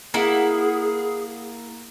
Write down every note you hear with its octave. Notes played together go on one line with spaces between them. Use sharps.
A#3 E4 G#4 F#5